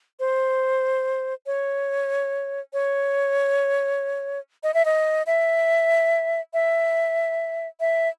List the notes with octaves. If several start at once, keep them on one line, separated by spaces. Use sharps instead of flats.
C5
C#5
C#5
D#5
E5
D#5
E5
E5
E5